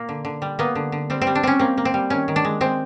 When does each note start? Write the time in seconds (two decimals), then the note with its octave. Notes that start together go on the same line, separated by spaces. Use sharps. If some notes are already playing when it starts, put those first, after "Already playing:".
Already playing: A#2 A#3
0.09 D3
0.25 D3
0.42 G3
0.59 A#3 B3
0.75 D3
0.92 D3
1.10 G3 C4
1.22 C4
1.27 G3
1.35 D4
1.43 G3 C4 C#4
1.59 A#3 C4
1.78 A#3
1.85 C4
1.94 G3
2.10 D#3 C#4
2.28 D#3
2.36 D4
2.45 G#3
2.61 G#3 C4